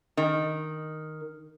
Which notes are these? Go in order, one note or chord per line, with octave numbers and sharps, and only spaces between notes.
D#3